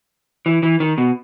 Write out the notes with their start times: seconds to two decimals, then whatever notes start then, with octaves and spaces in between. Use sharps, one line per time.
0.46 E3
0.63 E3
0.80 D#3
0.98 B2